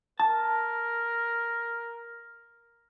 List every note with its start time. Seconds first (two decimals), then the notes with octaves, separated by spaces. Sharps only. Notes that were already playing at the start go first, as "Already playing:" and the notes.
0.20 A#4 A5